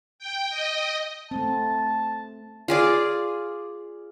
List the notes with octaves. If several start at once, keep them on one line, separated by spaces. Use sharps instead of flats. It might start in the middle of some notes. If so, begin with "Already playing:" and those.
G5
D#5
A3 C4 A5
F4 G#4 D5